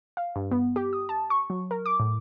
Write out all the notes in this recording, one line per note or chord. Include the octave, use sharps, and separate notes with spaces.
F5
G2
B3
G4
D#6
A5
C#6
F#3
A#4
D6
A2